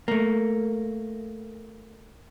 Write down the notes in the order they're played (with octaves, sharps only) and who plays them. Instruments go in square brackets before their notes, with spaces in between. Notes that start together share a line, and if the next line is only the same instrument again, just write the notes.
[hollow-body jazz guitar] A3 A#3